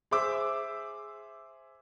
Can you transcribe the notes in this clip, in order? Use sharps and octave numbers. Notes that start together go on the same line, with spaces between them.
G#4 C5 E5 D6 E6